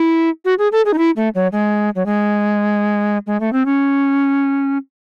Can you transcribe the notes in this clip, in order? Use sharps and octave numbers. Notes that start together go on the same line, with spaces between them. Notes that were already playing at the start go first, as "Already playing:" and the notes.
Already playing: E4
F#4
G#4
A4
G#4
D#4
E4
A3
F#3
G#3
F#3
G#3
G#3
A3
C4
C#4